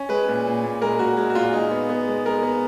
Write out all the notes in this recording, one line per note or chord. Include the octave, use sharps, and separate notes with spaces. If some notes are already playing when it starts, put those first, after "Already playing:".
Already playing: C#4
G#3 B4
A#2
A#2
A#2
G#3 A#4
A#2 F#4
G#3
F#4
A#2 F4
G#3 D#4
B3
B3
G#3
G#3 A#4
B3